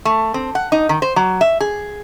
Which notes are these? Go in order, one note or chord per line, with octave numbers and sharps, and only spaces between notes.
A3
C4
F#5
D#4
D#3
C5
F#3
E5
G#4